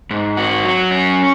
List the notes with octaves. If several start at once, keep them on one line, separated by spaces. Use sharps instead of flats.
G#2
F#4
F#3
C#4